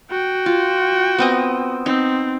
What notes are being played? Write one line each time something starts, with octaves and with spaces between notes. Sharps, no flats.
F#4 G5
F4
B3 C4 D#5
C4 D#4